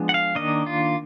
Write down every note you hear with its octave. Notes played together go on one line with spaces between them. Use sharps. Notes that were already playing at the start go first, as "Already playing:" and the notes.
Already playing: F3 G#3 B3 D4
F#5
F5
D#3 A#3 D4 D#5
F4